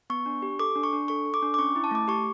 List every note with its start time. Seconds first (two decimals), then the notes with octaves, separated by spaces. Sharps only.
0.10 B3 C#6
0.26 D4
0.42 G4
0.59 A4 D6
0.76 D4
0.83 C#6
0.93 D4
1.08 A4 C#6
1.26 A4
1.34 D6
1.43 D4
1.54 D6
1.59 C#4 C#6
1.76 E4
1.84 A5
1.91 A3 D6
2.08 G4 C#6